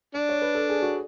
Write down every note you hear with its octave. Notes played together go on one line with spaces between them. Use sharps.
D4 D5
C#5
B4
A4
G#4
F#4